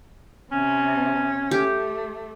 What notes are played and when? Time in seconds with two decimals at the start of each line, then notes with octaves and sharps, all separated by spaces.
0.52 C3 C#4
1.51 A3 G4